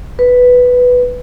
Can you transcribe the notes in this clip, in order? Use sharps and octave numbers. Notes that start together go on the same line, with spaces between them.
B4